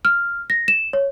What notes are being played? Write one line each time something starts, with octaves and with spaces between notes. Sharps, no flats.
F6
A#6
E7
C#5